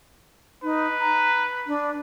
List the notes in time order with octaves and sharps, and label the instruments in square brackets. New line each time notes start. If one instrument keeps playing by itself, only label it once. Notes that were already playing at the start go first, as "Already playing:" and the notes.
[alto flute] D#4 [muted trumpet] B4
[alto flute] A#5
D4